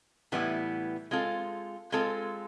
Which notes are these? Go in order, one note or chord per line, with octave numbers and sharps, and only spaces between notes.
A2 E3 G3 B3 E4
G#3 C4 F4 A4
G#3 C4 F4 A4